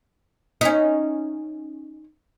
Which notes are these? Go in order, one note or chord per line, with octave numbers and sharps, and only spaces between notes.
C#4 D#4